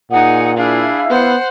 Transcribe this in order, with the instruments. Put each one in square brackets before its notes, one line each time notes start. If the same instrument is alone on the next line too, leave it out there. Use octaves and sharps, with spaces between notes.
[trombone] A#2 [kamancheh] D#4 G#4 [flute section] F#5 D#6
[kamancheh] D4 G#4 [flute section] E4 F5
[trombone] B3 [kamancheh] C5 F#5